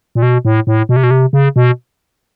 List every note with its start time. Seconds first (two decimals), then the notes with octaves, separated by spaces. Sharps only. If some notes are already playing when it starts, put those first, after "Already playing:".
0.15 A#2
0.22 B2
0.45 A2
0.67 A2
0.89 B2
0.96 C3
1.03 B2
1.11 C3
1.33 C#3
1.56 B2